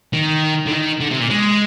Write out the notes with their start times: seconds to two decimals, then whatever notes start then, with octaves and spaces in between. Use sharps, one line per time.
0.13 D#3
0.66 D3
0.71 D#3
1.00 D3
1.10 C3
1.20 A#2
1.30 G#3